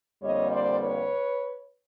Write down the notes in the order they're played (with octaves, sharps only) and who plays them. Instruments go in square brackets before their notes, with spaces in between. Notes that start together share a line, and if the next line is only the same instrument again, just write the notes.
[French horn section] F2 D3 G3 A#3 C#5 D#5
C5 D5
B4 C#5